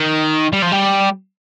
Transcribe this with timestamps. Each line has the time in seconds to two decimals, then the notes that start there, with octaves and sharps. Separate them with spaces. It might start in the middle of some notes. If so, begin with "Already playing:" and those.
Already playing: D#3
0.53 G3
0.62 F3
0.72 G3